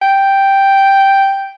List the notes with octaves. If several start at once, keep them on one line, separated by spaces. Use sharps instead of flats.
G5